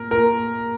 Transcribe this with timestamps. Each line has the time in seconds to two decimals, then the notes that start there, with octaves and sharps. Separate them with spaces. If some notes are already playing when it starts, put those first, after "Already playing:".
Already playing: A#2 A#4
0.11 A#2 A#4